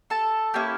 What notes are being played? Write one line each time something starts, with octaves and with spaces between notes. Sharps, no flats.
A4 A5
A#3 C#4 E4 G4